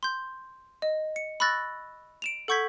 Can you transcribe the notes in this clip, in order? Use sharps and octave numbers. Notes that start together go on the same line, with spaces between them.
C6 G6
D#5
C#7
B5 C#6 E6 F#6 A6 A#6
D7 E7 F7
A4 F#5 C#6 G6 G#6 B6